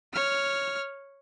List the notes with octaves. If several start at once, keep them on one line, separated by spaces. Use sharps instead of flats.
C#5 F6